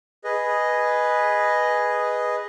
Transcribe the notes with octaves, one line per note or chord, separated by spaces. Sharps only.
G#4 B4 D#5